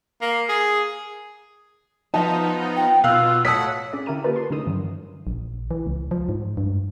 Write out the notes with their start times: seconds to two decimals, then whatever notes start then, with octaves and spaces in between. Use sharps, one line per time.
0.21 A#3
0.49 G#4
2.14 F3 B3 D#4 E5 A5
2.76 G5
3.04 B2 F4 F5 E6 F#6
3.45 A2 C#5 F#5 A5 D#6 B6
3.93 C#4 G#4 D5
4.06 D3 E4 G4 A#4 D#7
4.24 A#3 F4 G4 A#4 B4 A5
4.36 C6
4.50 A2 D3 C#4 D#4 D#6
4.66 G2 D#3 E3 F#3
5.27 A#1
5.71 E3
5.87 C#2
6.11 F3
6.29 G#2
6.57 G2